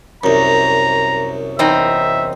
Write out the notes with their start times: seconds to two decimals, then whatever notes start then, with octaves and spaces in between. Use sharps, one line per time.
0.24 C2 F#2 A#5
1.59 E2 C4 D#4 E5